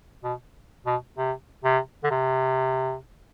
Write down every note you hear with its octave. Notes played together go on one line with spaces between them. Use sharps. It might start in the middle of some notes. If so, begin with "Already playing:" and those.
B2
B2
C3
C3
D3
C3